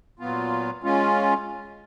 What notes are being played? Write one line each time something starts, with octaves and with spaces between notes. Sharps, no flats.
A#2 F#3 B3 F4
G#3 C#4 F4